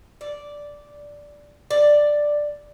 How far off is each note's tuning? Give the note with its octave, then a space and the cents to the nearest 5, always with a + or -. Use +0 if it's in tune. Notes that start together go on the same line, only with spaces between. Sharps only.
D5 -5
D5 +5